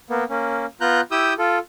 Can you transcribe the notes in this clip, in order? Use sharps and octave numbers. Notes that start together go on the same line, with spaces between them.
A#3 B3
A#3 C#4
B3 F4 A#5 F#6 G6
E4 G4 D#6 E6 G6
F4 A4